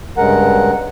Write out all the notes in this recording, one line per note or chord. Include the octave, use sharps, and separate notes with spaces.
G2 C#3 G#3 A#4 F#5